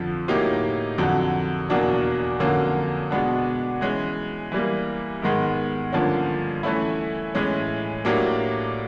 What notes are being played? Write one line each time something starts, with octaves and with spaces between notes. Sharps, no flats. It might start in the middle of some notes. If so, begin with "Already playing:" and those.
Already playing: F2 D3 F3
A2 F#3 A#3 D#4 G4
F2 D3 F#3
E2 B2 F#3 A#3 D4
F2 D3 F#3 A#3 C#4
B2 G#3 B3 D4
E3 G#3 C#4
E3 G3 A#3
G#2 D#3 G#3 B3
G2 D3 F3 A#3 C#4
E3 A3 C#4 E4
A2 E3 G#3 C#4
A2 F#3 A#3 D4 G4